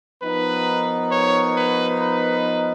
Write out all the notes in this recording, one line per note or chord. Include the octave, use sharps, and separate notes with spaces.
F3 B3 D#4 A#4 B4
C#5
B4
B4